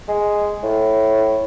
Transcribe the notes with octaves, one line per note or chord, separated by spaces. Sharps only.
G#3
A2